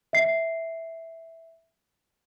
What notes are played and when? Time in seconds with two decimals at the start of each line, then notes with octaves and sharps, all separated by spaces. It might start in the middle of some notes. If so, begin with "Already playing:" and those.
0.13 E5 C7